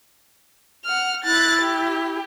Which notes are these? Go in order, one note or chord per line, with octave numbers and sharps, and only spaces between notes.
F#5 F6
E4 F#6 A6
G4